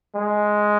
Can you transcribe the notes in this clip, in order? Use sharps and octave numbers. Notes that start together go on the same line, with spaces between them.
G#3